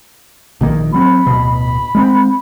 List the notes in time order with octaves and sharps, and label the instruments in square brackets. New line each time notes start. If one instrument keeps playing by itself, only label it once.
[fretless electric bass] A#1 D#3 A#3
[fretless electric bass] F#3 C4 [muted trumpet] B5
[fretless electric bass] D1 B2
G#3 B3 C4